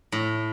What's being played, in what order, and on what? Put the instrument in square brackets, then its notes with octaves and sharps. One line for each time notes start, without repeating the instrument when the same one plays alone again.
[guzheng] A2